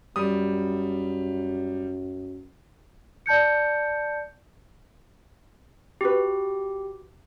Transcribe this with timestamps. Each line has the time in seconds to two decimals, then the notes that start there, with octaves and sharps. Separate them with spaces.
0.16 F#2 G3 D#6
3.26 D5 A5 G6 C#7
6.01 F#4 G4 B4